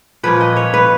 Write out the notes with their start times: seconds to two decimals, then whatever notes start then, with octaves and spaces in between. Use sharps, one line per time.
0.23 A#2 F3 A#3 C#4 B4
0.41 D#5
0.56 C#5
0.74 B4